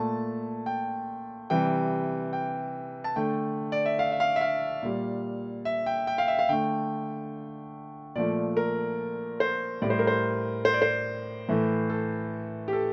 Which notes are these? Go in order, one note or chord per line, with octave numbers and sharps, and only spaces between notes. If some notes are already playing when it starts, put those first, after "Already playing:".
Already playing: A#2 A3 A5
G5
C3 E3 G3 G5
G5
A5
D3 A3 G5
D5
E5
F5
E5
F5
E5
F5
A#2 G3
E5
G5
G5
F5
E5
F5
D3 A3 G5
A#2 F3 A3 D5
A#4
C5
A2 G3 D5
C5
A#4
C5
C5
D5
C5
A2 E3 A3
A4
G4
A4